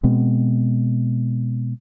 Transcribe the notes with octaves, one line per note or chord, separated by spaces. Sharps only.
B2 G#3 B3 C4